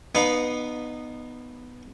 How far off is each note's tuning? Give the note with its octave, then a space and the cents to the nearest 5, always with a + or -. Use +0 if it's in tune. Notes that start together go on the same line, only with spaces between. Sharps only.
B3 +0 D#4 -20 F5 +30